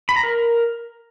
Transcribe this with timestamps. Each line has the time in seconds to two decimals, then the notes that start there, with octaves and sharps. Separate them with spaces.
0.09 B5
0.16 A#5
0.23 A#4